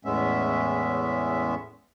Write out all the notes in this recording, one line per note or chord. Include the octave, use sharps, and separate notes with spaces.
E2 A2 G#3 B3 C#4 E5